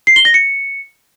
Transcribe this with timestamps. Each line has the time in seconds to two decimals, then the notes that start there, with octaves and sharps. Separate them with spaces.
0.07 C7
0.16 G7
0.25 A#6
0.34 C#7